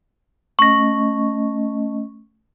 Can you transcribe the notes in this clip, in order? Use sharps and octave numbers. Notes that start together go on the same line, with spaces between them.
A3 C#4 D#5 C#6 A#6